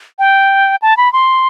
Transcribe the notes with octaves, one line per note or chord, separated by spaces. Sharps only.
G5
A5
B5
C6